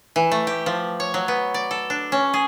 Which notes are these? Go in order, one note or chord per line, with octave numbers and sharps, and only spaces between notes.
E3
A3
G4
F3
C#5
F#3
B3
D5
A4
D4
C#4
G#4